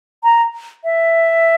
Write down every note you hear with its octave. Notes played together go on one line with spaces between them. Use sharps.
A#5
E5